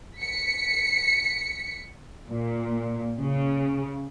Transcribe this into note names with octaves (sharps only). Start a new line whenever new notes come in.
B6 C#7
A#2
C#3